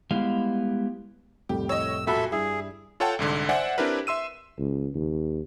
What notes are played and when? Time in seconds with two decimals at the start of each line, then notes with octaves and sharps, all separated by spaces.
0.11 G3 G#3 B3 E4 G4 F5
1.49 C2 F2 A2 G4
1.69 C#5 D#5 E6
2.07 A#2 F#4 A4 E5 B5
2.32 G2 E4 G#4
3.00 F4 A4 C#5 F#5 G5 A5
3.19 C2 G#2 D3
3.49 C5 D5 E5 F#5 G#5
3.78 C4 D4 E4 G4 A#4 B4
4.07 E5 C6 E6 D#7
4.58 C#2
4.94 D#2